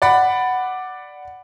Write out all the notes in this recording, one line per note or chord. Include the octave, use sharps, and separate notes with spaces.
D5 F#5 B5